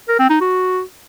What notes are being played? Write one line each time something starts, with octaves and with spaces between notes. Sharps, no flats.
A#4
C4
D#4
F#4